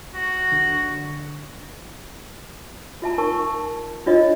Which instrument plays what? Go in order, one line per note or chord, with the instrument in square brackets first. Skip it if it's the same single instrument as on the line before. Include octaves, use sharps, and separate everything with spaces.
[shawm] F#4
[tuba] D3
[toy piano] F4 E5 A5 A#5
D#4 A#4 A5 C#6
D4 F4 C#5 D#5